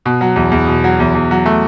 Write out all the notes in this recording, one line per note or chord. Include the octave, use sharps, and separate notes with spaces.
B2
F#3
E2
E2
B2
F#3
E2
E2
F#3
A3